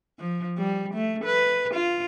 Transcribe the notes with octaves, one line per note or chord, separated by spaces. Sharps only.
F3
G3
A3
B4
F4